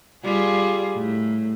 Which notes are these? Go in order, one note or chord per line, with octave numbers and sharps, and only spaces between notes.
G3 F4 G#4
A2